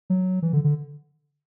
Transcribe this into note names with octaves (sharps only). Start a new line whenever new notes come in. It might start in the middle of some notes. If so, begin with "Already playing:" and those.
F#3
E3
D3
D3